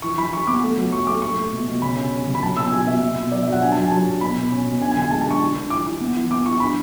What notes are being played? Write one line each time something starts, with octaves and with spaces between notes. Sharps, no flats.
E3 C#6
E3 B5
E3 C#6
B3 D6
A3
F#3
F#3 C#6
A3 D6
A3 C#6
A3
B2
B2
C#3 B5
C#4
C#4
C#3
B5
F#3 A5
B2 E6
F#3 G#5
B2 E5
B2
B2
F#3 D5
E5
F#3 F#5
D4 G#5
A5
F#3 G#5
F#3 A5
D4
B2 B5
B2
C#4
B2
D4 G#5
G#5
D3
G#5
G#3 A5
A5
D4 C#6
E3
D4
E3 D6
E3
B3
E3
B3 D6
E3 C#6
D4 B5